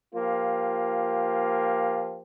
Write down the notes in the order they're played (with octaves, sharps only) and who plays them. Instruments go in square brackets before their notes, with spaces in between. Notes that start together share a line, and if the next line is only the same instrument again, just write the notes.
[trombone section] F3 A#3 F4 G4